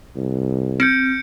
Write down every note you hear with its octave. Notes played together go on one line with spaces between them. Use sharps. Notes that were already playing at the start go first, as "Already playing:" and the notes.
C2
C4 G6 C#7 D7